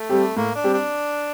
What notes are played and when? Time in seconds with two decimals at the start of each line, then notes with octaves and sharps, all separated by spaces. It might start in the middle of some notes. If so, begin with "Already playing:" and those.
Already playing: A3
0.09 G3 C4 G4
0.36 A2 A#3
0.55 D4
0.64 G3 C4 G4
0.74 D4